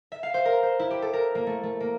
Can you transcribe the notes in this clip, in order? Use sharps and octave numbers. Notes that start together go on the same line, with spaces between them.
E5
F5
C5
A#4
C5
E4
G4
A4
A#4
A#3
A3
A3
A#3